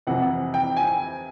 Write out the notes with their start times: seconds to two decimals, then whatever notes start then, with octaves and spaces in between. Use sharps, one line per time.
0.07 F2 C3 E3 F#5
0.54 G5
0.77 G#5